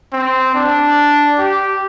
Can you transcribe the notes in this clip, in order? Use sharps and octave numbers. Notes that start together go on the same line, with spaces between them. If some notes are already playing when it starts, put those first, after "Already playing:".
C4
D4
G4